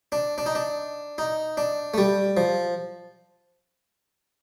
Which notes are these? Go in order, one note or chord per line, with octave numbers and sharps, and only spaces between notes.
D4
D4
D#4
D4
D#4
D4
A3
G3
F3